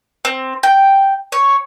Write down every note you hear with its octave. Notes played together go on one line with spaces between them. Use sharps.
C4
G5
C#5